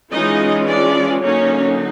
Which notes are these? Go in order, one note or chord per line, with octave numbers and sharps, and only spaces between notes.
E3 G#3 C#4 D#4 F4 D#5
D4 D5
D3 F#3 A#3 C#4 D#4 C#5